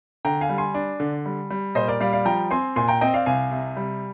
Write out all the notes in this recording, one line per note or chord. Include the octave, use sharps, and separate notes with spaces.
D3 G5 A#5
F5 G#5
G3
G#5 C6
D4
D3
G3
G3
A#2 C5 D#5
A#4 D5
G3 D5 F5
D5 F5
F3 G5 A#5
C4 G#5 C6
A#2 G#5 C6
G5 A#5
C4 D#5 G5
D5 F5
C2 F5 G#5
C3
G3